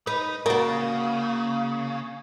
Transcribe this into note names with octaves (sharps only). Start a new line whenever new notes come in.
D#4 B4
C#3 A#3 F#4 A#4 D5